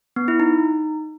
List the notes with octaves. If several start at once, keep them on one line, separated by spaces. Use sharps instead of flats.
B3
E4
D#4